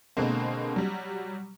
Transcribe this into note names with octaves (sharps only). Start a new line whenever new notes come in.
B2 D3 G#3 A#3 C4
F#3 G3